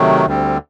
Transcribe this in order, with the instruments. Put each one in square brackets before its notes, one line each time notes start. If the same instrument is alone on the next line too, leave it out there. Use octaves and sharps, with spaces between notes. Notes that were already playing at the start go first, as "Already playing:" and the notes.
Already playing: [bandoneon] C3 D#3 F#3 A3
D2 D3 G3 C4